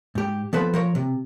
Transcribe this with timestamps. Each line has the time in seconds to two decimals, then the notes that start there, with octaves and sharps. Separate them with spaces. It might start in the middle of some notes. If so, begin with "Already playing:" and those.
0.15 G#2 G4
0.53 F3 B3 A4 B4 C5
0.74 F3 A#4 C#5
0.95 C3